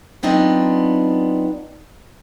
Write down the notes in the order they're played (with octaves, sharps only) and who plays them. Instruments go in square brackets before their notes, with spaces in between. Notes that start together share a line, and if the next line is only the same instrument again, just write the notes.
[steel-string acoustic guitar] F#3 B3 C4 D4 D#4 F4